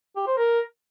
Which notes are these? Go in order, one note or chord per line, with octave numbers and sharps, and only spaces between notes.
G4
C5
A#4